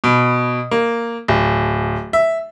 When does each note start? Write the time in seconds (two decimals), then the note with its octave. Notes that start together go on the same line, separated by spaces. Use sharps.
0.04 B2
0.71 A#3
1.28 D1
2.13 E5